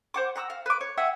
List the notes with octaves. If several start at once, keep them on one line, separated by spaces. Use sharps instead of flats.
C5 F#5 D6
F#5 A#5 D#6 E6
F5
B4 D6
C#5
E5 F#5 G#5